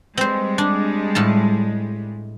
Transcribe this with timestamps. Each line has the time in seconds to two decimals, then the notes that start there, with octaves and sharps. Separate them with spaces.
0.17 G3 G#3 C4 C5
0.58 D4
1.15 A2 F4 A5